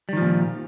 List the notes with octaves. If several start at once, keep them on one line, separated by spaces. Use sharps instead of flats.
A#2 D#3 F3 G3